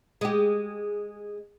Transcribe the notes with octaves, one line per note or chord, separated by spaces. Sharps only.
G#3 G4